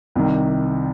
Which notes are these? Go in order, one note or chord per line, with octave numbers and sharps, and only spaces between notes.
C2 C3 D#3